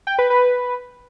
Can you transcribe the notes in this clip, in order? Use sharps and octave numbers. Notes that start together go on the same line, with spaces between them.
G5
B4
B4